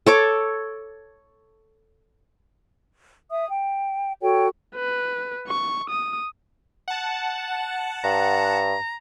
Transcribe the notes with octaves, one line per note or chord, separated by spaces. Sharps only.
A4 C#5 D6
E5 D#6
G5
F#4 A4 C#5 G5
B4
C#6
D#6
F#5 A5
G2 A#5